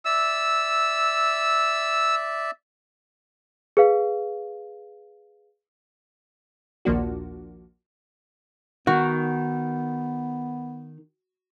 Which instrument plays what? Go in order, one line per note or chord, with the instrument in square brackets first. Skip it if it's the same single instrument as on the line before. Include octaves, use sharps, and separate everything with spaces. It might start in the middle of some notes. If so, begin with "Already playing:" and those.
[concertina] D5 E5 [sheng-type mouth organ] E6
[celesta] G#4 B4 F5
[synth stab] A#1 D#2 F3 A#3 D4 F#4
[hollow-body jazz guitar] D#3 [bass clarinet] B3 [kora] F#4